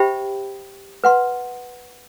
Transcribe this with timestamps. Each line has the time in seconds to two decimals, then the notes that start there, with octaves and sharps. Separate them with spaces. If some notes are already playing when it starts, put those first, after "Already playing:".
Already playing: G4 C5 E5 G5 B5
1.04 B4 F#5 C6